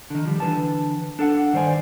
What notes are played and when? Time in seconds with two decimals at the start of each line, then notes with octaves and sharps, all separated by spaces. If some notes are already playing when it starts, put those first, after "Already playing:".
0.10 D3 D#3
0.25 F3 G3
0.40 D3 E3 B4 A5
1.19 D4 A4 F5 F#5
1.53 G2 D#3 C5 D5 G#5